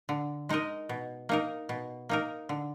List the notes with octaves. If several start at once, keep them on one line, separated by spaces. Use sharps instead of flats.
D3
G#3 D#4 A#4 D#5
B2
A#3 D#4 A#4
B2
A#3 D#4 A#4
D3